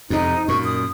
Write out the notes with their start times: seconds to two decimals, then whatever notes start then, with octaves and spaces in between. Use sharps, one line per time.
0.10 F2 C3 D#4
0.48 F#2 A#2 C#6
0.64 D#6